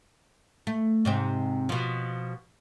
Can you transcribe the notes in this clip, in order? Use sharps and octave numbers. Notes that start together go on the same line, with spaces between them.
A3
G#2 C3 C4
B2 F3